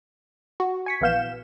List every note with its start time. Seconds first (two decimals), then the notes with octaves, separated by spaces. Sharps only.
0.60 F#4
0.86 G#5 C#6 B6
1.01 A#1 E3 B3 F5 G6 E7